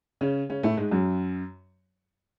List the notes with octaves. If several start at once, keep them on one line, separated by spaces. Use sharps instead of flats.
C#3 C#4
C#3 C#4
A2 A3
G#2 G#3
F#2 F#3